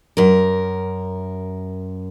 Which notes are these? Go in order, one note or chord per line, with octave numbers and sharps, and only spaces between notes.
F#2 A#4